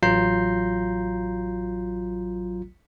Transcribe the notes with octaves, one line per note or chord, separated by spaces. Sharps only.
A1 F#3 F4 A#5 G6 C7